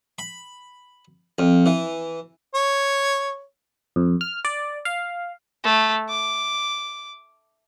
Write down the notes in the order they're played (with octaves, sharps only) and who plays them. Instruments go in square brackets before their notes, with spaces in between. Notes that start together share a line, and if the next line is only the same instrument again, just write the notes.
[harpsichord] B5
F2
E3
[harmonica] C#5
[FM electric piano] F2
F6
D5
F5
[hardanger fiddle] A3
D6